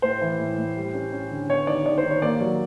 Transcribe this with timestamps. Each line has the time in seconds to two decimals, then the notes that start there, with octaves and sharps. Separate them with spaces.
0.02 A2 C5
0.22 E3
0.40 A2
0.58 A2
0.76 G3
0.94 C#4
1.13 C#4
1.31 D3
1.49 B3 C#5
1.67 D#3 D5
1.86 D#3 D5
1.98 C5
2.04 D#3
2.10 C#5
2.22 A#3 D5
2.41 F#3